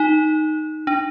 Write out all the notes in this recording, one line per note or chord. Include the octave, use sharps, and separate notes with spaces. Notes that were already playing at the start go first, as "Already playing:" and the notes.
Already playing: D#4
D4